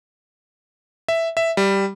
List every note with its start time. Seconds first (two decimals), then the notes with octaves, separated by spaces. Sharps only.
1.08 E5
1.37 E5
1.57 G3